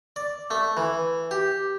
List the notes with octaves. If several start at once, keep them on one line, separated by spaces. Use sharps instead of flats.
D5
A3
E3
G4